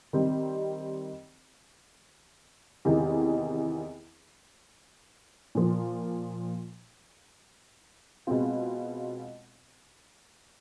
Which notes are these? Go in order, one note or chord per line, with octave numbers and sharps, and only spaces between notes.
D#3 G3 C4
E2 C3 D#3
A#2 F3 A#3
B2 G#3 C4 F4